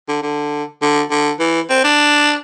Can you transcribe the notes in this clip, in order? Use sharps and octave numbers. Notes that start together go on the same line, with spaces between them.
D3
D3
D3
D3
E3
C4
D4